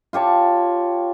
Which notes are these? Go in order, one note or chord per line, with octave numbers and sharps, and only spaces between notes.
F4 G4 C#5 A5